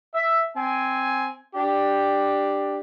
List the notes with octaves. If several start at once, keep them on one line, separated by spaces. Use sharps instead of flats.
E5
C4 G#5
D4 G4